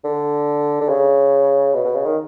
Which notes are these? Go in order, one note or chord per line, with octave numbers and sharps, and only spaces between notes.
D3
D3
C#3
B2
B2
C#3
D#3